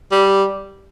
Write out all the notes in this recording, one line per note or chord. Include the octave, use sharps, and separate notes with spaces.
G3